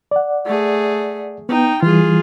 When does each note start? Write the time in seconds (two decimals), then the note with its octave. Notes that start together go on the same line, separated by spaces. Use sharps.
0.11 D5 F#5
0.46 A3 G#4
1.49 B3 D#4 G5
1.83 E3 G3 F4 G#4